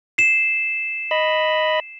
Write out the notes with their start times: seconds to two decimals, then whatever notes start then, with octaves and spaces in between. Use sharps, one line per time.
0.18 C7 E7
1.11 D#5 B5